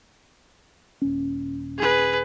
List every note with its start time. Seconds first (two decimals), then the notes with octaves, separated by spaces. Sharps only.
1.02 D#1 C#4
1.78 G#4 B4